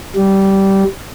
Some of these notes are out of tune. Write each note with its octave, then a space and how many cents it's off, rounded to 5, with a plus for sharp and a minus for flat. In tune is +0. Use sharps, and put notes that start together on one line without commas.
G3 -15